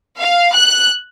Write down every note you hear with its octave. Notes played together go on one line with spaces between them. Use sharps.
F5
F#6